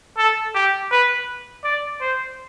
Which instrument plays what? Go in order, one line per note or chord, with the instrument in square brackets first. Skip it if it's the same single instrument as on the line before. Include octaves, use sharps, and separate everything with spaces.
[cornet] A4
G4
B4
D5
C5